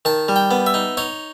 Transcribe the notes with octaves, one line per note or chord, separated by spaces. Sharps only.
D#3 A5
G3
G5
B3
E5
D#4
D#4 C#5